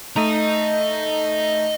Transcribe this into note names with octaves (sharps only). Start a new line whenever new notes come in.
A3 D#4 D#5 A#5